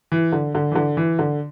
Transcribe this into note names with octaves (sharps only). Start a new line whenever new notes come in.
E3
D3
D3
E3
D3
E3
D3